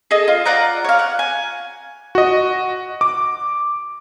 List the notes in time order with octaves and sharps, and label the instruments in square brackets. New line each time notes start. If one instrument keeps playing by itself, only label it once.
[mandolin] G#4 A4 D#5
F4
F4 D5 F#5 A#5
C#5 F5
F#5
G#5
[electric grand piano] F#4 D#5
D6